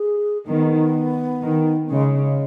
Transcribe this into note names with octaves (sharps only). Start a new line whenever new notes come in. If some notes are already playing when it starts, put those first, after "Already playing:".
Already playing: G#4
D#3 B3
D#3
C#3 G#3
G#3